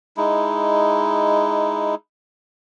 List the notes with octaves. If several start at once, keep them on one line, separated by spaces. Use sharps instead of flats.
G#3 D#4 E4